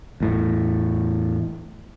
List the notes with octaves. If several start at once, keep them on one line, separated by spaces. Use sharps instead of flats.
E2 A2